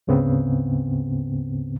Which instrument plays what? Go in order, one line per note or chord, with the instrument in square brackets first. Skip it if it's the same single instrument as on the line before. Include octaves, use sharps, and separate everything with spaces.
[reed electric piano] D2 G#2 C#3 B3 C4